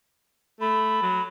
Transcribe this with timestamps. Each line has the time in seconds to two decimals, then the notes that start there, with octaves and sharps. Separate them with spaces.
0.61 A3 B5
1.03 F#3